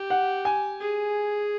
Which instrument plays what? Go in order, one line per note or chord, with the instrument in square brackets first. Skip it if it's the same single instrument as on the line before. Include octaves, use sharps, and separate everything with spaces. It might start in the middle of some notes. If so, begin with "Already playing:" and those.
Already playing: [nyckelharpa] G4
[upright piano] F#5
G#5
[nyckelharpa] G#4